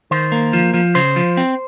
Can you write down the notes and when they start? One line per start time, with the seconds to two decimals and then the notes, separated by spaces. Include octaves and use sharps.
0.11 D#3 C5
0.32 A#3
0.53 F3
0.74 F3
0.95 C#3 C5
1.16 F3
1.37 C4